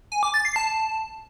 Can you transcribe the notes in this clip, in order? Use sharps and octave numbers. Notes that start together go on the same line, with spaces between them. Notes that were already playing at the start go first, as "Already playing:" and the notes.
G#5
D6
A6
C7
A5